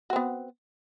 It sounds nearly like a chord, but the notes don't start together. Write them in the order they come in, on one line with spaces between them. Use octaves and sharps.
F#4 C4 B3